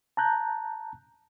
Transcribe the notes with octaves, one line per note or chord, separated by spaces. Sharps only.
A5 A#5 F#6 G6